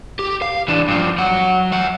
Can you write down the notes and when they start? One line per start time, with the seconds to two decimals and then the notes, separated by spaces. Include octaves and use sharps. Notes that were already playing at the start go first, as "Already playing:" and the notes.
0.19 G4
0.42 F5
0.68 E3 D4
0.88 G2 F3
1.18 F#3 F#5
1.72 E5 F#5